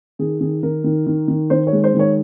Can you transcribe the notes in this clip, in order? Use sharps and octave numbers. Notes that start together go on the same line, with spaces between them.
D#3 G#4
D#3 G#4
D#3 A#4
D#3
D#3
D#3
D#3 C5
C#5
G#3
C5
D#3
C#5